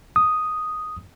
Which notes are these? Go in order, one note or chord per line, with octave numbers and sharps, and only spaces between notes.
D#6